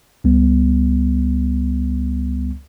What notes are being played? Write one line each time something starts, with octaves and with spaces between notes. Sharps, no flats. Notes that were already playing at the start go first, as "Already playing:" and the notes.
C#2 G3 B3